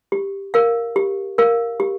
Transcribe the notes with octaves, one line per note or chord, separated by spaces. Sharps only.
G4
A#4 F5
G4
A#4 F5
G4